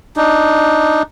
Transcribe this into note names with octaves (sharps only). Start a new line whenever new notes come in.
D4 D#4